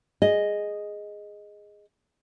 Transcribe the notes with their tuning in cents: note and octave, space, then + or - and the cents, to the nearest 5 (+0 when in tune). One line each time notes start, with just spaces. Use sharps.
G#4 +0 D#5 -5